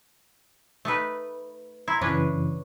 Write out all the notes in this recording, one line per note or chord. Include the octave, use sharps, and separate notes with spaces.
A3 D#4 B4
E4 A#5 C6 G#6
F#2 C#3 E3 C#4 D4 B4